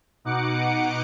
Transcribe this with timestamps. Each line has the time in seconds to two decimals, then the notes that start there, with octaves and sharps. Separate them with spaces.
0.25 B2 D#4 F#5 D6 C#7